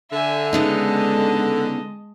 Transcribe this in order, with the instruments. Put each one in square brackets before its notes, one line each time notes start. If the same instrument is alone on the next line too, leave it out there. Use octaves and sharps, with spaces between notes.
[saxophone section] D3 [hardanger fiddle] E5 G#5
[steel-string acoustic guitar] C#3 B3 D#4 [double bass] G#3 [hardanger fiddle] D#5 A5